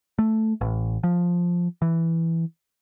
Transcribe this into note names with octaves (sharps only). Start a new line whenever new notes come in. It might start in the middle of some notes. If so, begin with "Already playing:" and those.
A3
A1
F3
E3